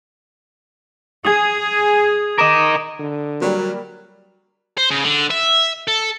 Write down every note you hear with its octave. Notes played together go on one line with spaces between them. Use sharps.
G#4 D#6 G#6
A#4 D#5 D6 D7 E7
D3
F#3 G3 A#3
C5
C#3
D3
E5
A4